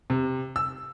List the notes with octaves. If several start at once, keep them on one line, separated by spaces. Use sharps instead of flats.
C3
E6